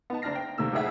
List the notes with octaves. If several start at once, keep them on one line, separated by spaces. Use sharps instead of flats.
B3 D#4 A5
F#1 D4 A5 F6 A#6 C7
G5
D#2 C3 A#3 A4 E6
A1 F2 D#4 G#4 E5 F#5